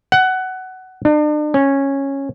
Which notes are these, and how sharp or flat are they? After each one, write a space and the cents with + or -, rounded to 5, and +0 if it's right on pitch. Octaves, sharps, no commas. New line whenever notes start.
F#5 +15
D4 +40
C#4 -10